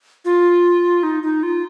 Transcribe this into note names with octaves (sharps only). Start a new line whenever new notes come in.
F4
D#4
D#4
F4